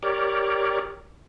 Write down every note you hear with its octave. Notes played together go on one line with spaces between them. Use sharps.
G4 A#4 C#5 D5